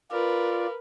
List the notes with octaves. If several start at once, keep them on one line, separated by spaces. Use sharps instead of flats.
F4 A#4 B4 D5